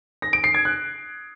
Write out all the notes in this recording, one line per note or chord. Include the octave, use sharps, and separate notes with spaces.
A#6
D7
C7
G#6
F#6